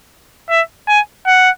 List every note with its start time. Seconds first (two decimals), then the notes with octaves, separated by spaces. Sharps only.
0.49 E5
0.88 G#5
1.26 F#5